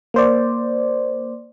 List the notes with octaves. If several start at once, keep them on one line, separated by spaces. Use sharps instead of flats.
A#3 C5 D5